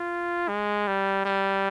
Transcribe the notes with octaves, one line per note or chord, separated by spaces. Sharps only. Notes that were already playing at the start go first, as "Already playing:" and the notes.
Already playing: F4
G#3
G3
G3